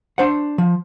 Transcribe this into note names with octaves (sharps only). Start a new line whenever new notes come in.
D4 C5 F#5
F3